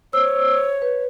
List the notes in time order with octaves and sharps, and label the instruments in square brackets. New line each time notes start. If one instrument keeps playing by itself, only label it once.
[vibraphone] C5 E6 [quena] C#5
[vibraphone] B4